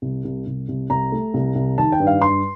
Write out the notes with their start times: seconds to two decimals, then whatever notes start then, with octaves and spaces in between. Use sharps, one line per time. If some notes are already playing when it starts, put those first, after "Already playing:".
0.02 C2
0.25 C2
0.47 C2
0.69 C2
0.90 C2 A#5
1.12 A3
1.34 C2
1.55 C2
1.78 D#3 A5
1.92 G5
2.00 G2
2.07 F5
2.22 G2 C6